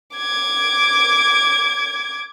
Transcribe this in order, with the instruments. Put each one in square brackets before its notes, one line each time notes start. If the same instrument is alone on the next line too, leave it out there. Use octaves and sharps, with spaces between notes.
[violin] D6 G#6